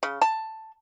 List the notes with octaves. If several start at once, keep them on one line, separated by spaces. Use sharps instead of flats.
C#3
A5